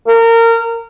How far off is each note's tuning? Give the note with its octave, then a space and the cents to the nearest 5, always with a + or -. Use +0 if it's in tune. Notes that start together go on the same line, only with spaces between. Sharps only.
A#4 -25